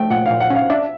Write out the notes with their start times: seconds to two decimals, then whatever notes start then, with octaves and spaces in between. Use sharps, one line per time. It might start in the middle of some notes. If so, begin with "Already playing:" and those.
Already playing: A3 G5
0.10 A#2 F#5
0.26 A#2 F5
0.40 F#5
0.50 C#4 F5
0.70 D4 E5